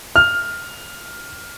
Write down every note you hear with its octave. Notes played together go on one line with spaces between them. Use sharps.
F6